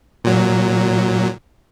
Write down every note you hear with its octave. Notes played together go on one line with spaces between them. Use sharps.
A#2 F#3